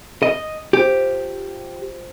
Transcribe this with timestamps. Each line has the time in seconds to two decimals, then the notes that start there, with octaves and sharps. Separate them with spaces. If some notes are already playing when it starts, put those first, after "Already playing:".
0.22 D#5
0.73 F3 G4